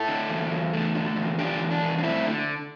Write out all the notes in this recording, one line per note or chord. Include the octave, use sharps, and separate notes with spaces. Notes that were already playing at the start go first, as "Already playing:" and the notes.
Already playing: E4 A4
D3
E2
E2
A3
D3
E2
D3 D4 G4
E2
D4
E2
D4
A3 C4 E4
D3